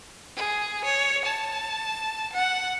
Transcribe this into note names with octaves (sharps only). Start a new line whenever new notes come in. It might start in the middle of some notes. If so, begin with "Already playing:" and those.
G#4
C#5
A5
F#5